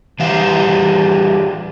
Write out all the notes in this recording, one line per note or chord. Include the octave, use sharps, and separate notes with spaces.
E3 G3 F5